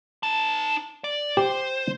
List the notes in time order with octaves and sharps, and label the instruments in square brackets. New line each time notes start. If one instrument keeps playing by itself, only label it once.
[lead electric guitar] D#4 A5
D5
[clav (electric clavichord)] G4 [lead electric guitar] C5